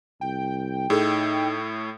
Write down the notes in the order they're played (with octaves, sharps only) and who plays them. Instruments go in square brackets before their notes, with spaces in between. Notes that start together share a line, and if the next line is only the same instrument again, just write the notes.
[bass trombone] C2 [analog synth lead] G5
[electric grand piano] A2 E6 [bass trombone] D#4 [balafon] G#4 A4